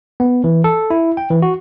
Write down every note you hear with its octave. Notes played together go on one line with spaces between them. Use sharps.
B3
E3
A4
E4
G5
E3
F#4